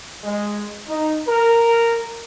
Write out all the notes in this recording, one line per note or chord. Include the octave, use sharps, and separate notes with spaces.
G#3
D#4
A#4